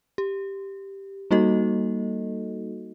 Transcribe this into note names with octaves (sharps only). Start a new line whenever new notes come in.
G4
G3 A#3 D#4 F#4 A4 D#5